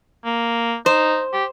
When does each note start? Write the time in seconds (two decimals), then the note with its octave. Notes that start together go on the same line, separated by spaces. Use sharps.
0.25 A#3
0.86 D#4 C5
1.33 G4